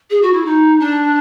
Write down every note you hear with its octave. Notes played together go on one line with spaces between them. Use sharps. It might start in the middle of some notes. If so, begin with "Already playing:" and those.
G#4
F#4
E4
D#4
D4